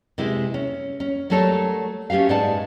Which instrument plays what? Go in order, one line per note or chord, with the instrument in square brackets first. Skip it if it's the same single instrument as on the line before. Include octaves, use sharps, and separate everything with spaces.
[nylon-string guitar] C3 G#3 E4 B4
C#4
C#4
F#3 G3 A3 A4 A#4 C#5
A3 C#4 G4 B4 F5
G#2 D#4 B4 D5 F#5 A5